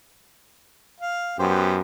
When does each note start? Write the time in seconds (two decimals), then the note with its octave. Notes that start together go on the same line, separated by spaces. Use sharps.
1.00 F5
1.39 F#2 B3 G4 C5